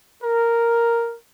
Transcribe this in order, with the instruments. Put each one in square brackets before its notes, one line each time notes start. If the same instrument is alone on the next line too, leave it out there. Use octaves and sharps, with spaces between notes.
[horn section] A#4